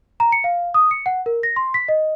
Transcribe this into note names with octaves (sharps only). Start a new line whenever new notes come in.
A#5
C#7
F5
D#6
C#7
F#5
A#4
A#6
C6
B6
D#5